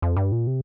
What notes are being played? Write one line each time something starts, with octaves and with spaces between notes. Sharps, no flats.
F2
G2
A#2
C3